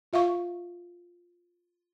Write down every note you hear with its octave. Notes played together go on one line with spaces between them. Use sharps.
F4 E5 F5 C#6